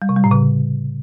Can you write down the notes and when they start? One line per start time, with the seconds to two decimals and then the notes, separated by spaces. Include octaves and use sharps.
0.02 G3
0.09 C3
0.16 G3
0.24 A2
0.31 C#3